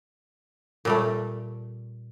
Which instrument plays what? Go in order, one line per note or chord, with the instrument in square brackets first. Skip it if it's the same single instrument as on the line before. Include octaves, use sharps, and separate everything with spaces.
[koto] A#2 G3 A3